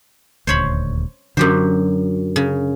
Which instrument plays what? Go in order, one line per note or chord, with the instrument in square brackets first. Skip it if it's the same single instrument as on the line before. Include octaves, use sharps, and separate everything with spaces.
[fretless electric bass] D#1 D2 [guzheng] C5 C#5 B5
[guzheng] F#2 G4 C5 [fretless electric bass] D3 F#3
[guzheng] C#3